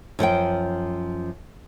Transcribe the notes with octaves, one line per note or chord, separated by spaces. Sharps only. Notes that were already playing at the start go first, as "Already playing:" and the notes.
F#2 F3 A#4 G5